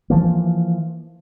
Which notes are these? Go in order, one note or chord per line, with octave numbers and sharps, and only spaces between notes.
E3 F3 A#3